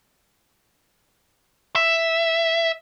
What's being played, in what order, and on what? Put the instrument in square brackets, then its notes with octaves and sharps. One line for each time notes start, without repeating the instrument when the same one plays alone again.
[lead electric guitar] E5